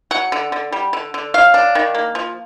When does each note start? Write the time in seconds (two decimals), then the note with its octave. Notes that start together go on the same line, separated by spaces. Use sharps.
0.11 F#3 F#5
0.32 D3
0.52 D3
0.72 G3
0.93 D3
1.14 D3
1.34 F#3 F5
1.54 D4
1.75 D#3
1.95 A#3
2.15 F3